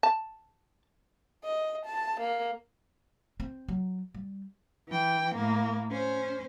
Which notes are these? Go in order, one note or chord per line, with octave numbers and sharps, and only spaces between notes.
A5
D#5
A5
A#3
C4
F#3
G3
E3 G5
A2 A#3
C#4 C5